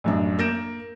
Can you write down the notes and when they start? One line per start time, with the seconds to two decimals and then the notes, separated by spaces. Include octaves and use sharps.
0.04 A1 F#2 D4
0.39 A#3 G6 A#6 D7 E7